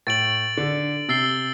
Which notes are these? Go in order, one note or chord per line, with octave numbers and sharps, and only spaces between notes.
A2 A6 D7 F#7
D3
C3 E6 A6 C7 G7